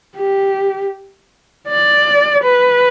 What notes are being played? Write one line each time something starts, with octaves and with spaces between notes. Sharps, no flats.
G4
D5
B4